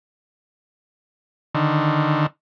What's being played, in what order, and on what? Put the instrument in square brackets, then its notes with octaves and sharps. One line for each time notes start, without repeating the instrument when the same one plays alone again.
[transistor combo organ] D3 D#3